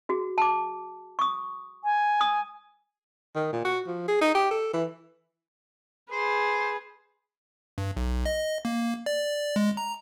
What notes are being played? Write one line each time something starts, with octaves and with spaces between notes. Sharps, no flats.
F#4 G#4
A5 D6
C#6 D#6
G#5
D#6
D#3
A#2
F#4
F3
G#4
D#4
G4
A4
E3
G#4 B4 C5
G2
B1
D#5
A#3
D5
G#3
A#5